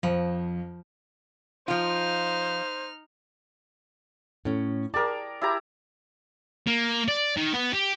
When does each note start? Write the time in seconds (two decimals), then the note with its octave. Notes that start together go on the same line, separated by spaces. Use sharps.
0.03 F2 F3
1.68 F3 D#4 F4 C5 F6
4.45 A2 C#4
4.94 G#4 A#4 D5 G5 A5
5.42 E4 G4 A#5
6.67 A#3
7.08 D5
7.37 D#3
7.53 B3
7.73 G4